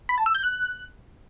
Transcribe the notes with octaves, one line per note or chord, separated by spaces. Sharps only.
B5
A5
E6
G6
F#6